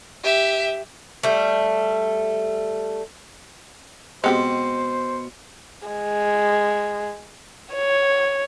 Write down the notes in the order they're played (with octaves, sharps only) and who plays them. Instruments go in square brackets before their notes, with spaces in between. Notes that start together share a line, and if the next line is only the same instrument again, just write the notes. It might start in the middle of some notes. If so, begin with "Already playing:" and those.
[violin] G4 E5
[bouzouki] G3 A3
[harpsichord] B2 [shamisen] G#3 C4 G4 [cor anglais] C5
[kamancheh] G#3
C#5